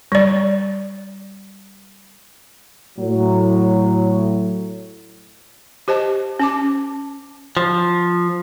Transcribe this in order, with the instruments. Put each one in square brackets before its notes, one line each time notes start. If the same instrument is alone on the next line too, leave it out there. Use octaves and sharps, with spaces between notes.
[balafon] G3 D5
[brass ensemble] A2 F#3
[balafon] G4 C5 D#5 A5
C#4 A5 D6
[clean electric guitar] F3